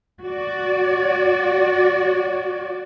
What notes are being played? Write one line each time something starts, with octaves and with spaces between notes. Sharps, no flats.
F#4 D5